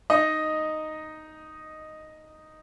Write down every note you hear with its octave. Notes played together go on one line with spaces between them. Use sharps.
D#4 D#5